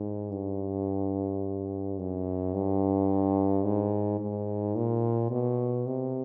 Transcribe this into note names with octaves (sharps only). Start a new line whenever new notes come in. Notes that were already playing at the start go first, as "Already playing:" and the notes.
Already playing: G#2
G2
F#2
G2
G#2
G#2
A#2
B2
C3